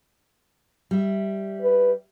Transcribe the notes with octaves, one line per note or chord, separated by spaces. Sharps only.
G3 E5
B4